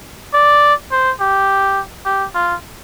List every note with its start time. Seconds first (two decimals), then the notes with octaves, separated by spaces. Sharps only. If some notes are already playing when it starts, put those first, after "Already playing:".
0.34 D5
0.91 C5
1.20 G4
2.05 G4
2.35 F4